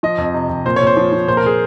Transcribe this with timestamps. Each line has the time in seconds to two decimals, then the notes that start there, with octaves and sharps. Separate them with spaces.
0.03 F3 D#5
0.18 F2
0.34 C3
0.49 F2
0.65 A#2 C5
0.76 C#5
0.81 A#2
0.87 C5
0.97 F3
1.12 F3
1.28 A#2 C5
1.37 A#4
1.44 A#2 G#4